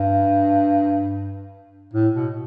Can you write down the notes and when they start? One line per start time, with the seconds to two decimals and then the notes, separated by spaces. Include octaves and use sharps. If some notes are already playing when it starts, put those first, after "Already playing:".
Already playing: G2
1.93 A2
2.14 B2